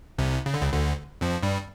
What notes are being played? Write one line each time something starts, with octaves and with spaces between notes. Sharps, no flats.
C2 C3
C#3
D3
C#2 C#3
D2 D3
F2 F3
G2 G3